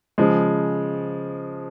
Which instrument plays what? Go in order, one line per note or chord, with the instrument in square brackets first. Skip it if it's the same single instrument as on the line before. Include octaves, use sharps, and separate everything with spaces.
[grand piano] C#3 F3 G#3